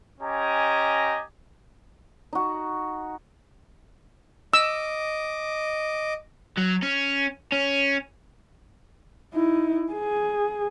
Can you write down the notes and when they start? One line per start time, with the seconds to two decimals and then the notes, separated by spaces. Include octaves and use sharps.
0.21 C#4 G4 D#5 G#5 A#5
2.33 D#4 F#4
4.54 D#5 D6 E6
6.58 F#3
6.83 C#4
7.52 C#4
9.33 D#4 E4
9.93 G#4